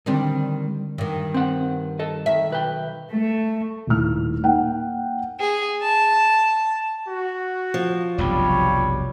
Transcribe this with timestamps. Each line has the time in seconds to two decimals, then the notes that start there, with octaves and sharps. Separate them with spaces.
0.06 D3 D#3 G3 C4 D4
0.98 G2 D#3
1.34 C4 F#5
1.99 A4 D#5
2.26 D#3 E5
2.50 B1 B4 G5
3.11 A3
3.87 D#1 A2 F6
4.43 A#3 D#4 F#5 G5
5.40 G#4
5.81 A5
7.09 F#4
7.74 F3
8.18 F1 B1 G2 G3 C#5